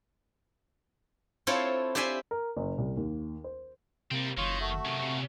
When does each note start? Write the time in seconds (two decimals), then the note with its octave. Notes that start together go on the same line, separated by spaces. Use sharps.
1.47 C4 E4 F4 A4 C5 C#5
1.95 G4 C5 D5 E5 G#5
2.31 A#4
2.57 F#1
2.78 C2
2.97 D#2
3.44 C5
4.11 C3 G3 A#3 C4
4.37 F#1 D#3 F4 C#5
4.60 A3 F#4 E5
4.85 F#2 C3 D#3
5.02 A#2 C#3